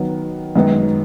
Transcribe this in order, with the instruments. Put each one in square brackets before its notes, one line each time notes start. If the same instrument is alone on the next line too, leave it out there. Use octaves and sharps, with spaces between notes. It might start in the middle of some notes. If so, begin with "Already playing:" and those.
Already playing: [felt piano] D#3 F#3 B3
F#2 D#3 G#3 B3 D#4